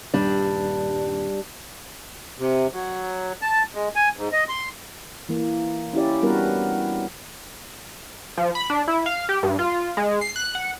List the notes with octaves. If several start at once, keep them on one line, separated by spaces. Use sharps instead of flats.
D#1 G2 G3 D4
C3
F#3
A5
G#3
G#5
G#2
D#5
C6
E3 A#3
C#4 E4 G4 D5
G3 B3 D4 F#4 A#4 B4
F3
B5
D4
E4
F5
G4
G2
F4
G#3
C7
F#6
F#5